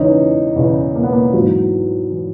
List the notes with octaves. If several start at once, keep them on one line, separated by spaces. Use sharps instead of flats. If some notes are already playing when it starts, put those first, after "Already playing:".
Already playing: E2 C#3 E3 C#4 D#4
E2 C#3 E3
A#3
B3
A#3
G#2 E3 F#3
E3